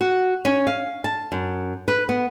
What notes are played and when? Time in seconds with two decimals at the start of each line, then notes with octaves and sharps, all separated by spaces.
0.01 F#4
0.45 C#4
0.67 F5
1.04 A5
1.32 F#2
1.88 B4
2.09 B3